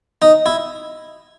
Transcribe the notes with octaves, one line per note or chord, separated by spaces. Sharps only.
D#4
E4